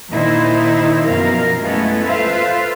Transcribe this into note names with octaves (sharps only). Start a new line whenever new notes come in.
A#2 D#3 D#4 E4 C5
F#2 B2 F3 C#4 A#4 F5
G#3 A3 B3 C#4 E4
F4 A4 B4 C5 E5 F5